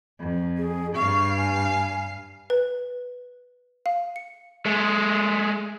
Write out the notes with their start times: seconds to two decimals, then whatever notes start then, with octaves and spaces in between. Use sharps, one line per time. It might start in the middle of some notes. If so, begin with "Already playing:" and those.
0.20 F2
0.58 G#4
0.95 G2 F5 C#6
1.37 G#5
2.50 B4
3.86 F5
4.16 C#7
4.66 G#3 A3